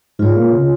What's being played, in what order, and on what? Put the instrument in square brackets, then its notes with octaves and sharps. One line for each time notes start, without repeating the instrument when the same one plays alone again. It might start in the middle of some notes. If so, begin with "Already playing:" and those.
[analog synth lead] G#2 [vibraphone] C#4 F4 G#4 C#5
[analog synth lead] A#2
C#3